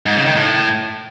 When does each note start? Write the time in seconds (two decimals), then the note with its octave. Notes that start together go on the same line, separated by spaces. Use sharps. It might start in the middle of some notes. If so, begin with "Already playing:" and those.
0.06 G#2
0.16 C#3
0.26 D#3
0.36 A2